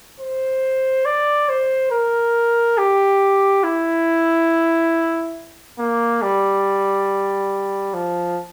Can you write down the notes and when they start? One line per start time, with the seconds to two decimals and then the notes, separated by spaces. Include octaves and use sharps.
0.20 C5
1.05 D5
1.49 C5
1.91 A#4
2.78 G4
3.64 E4
5.78 A#3
6.22 G3
7.94 F3